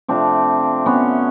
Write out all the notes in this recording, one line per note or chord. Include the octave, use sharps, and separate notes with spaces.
C3 F3 A3 C4 D4
B3 C#4